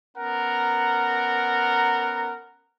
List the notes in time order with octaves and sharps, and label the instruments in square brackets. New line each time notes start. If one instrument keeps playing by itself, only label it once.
[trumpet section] B3 C#4 A#4 F#5 A#5